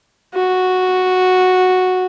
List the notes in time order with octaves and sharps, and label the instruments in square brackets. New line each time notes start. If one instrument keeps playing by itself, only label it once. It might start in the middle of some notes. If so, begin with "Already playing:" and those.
[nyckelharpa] F#4